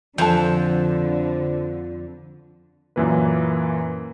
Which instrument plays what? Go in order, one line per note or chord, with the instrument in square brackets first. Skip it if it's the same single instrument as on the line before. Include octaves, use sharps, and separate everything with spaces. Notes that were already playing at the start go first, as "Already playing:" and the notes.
[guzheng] F2 [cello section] D3 [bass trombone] F3 [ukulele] C5 A5
[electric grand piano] F#2 A#2 E3 A#3 B4